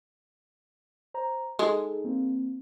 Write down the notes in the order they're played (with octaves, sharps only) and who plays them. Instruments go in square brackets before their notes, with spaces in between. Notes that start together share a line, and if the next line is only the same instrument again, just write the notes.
[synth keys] C5 A#5
[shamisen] G#3 [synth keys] D#4 G#4 A4
[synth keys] A#3 C4